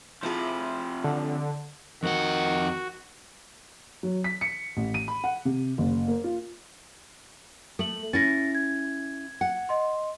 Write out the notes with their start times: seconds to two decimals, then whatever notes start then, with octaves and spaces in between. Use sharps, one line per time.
0.23 C3 F3 E4 F4 G#4
1.04 D3
2.03 F2 D#3 F#4 F#5
4.03 F#3
4.24 B6
4.41 C#7
4.77 A1
4.94 D#7
5.08 B5
5.24 F#5
5.45 C3
5.78 F#1
6.08 A#3
6.24 F4
7.79 A3 A4 F#7
8.13 C#4 E4 A6 A#6
8.55 G#6
9.41 F#5
9.69 D#5 C6